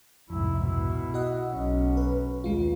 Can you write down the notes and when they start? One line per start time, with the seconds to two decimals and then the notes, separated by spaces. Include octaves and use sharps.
0.30 C2 F2 G#2 E4
0.62 B2 E4
1.14 F#4 D#5 F#5
1.50 B1 C#4
1.97 B4
2.44 D#2 G#3 F4